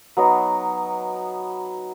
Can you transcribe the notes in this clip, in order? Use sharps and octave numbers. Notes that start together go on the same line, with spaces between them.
F#3 B3 D#4